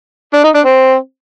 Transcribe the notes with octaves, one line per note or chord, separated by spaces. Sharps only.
D4
D#4
D4
C4